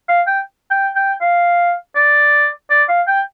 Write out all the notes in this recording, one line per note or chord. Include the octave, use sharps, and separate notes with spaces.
F5
G5
G5
G5
F5
D5
D5
F5
G5